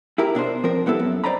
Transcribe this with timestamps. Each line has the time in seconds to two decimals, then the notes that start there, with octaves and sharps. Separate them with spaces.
0.18 E4 G4 A#4
0.35 B2 D4 A#4 C5
0.64 F3 C4 A#4
0.86 G3 B3 E4 A4
0.99 F#2
1.24 C5 D5 D#5 A#5 B5